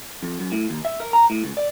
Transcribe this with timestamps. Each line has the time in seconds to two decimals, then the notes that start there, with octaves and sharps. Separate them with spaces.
0.23 F2
0.40 F#2
0.52 A2
0.70 D#2
0.85 E5
1.00 A#4
1.13 A#5
1.30 A2
1.44 C#2
1.57 D5